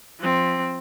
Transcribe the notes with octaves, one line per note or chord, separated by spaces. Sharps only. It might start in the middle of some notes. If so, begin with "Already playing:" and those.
F3 C4